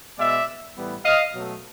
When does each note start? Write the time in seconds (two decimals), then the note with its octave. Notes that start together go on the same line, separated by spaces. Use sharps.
0.17 B2 G#3 B3 D5 E5
0.75 A2 E3 G3 B3
1.04 D#5 F5
1.33 B2 F#3 A3